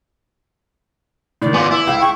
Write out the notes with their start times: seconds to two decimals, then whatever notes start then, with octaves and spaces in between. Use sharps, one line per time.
1.42 A2 D#3 D5
1.54 B3 F4 G#5 C6 D6
1.71 E4
1.87 C#2 F5 G5
2.01 G5 C#6